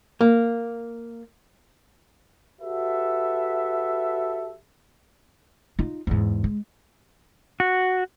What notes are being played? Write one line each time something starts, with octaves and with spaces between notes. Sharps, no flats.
A#3
F#4 G4 A4 B4 E5
D#4 F4
E2 G#2
G#3
F#4